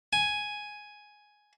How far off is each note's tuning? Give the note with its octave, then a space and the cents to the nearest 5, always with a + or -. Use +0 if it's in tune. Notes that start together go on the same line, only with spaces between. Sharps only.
G#5 +5